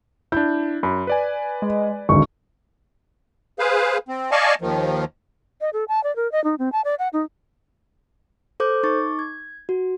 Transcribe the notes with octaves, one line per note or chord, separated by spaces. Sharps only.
D4 E4 G6
F#2 B5
B4 D5 G#5
G#3
G#1 D2 G#3 C#6
G#4 B4 C5 F5
C4
D5 D#5 F5 G#5 A5 C#6
D#2 D#3 F3
D#5
A4
A5
D5
A#4
D#5
D#4
C4
A5
D5
F#5
D#4
A4 C5 D6 G6
D#4 C#6 D6 A6
G#6
F#4